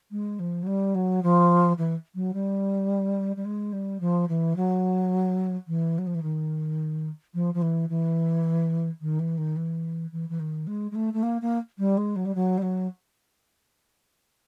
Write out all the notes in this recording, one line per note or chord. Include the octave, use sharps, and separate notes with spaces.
G#3
F3
F#3
G3
F#3
F3
E3
F#3
G3
G3
G#3
G3
F3
E3
F#3
E3
F#3
F3
E3
D#3
F3
F3
E3
E3
D#3
E3
D#3
E3
E3
E3
D#3
G#3
G#3
A3
A3
A#3
A#3
G3
G#3
F#3
G3
F#3
G3
F#3